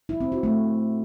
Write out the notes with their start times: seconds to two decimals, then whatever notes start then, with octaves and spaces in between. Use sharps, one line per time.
0.09 E4
0.21 C4
0.32 F#4
0.43 A3